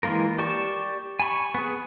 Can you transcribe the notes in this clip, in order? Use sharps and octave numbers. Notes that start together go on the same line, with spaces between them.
E3 G#3 A#3 F4 A#4
G4 D5 A5 C#6
G#5 A5 B5 C#6
B3 G#4